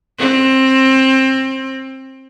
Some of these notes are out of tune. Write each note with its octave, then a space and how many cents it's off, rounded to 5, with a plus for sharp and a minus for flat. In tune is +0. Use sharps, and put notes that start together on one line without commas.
C4 +20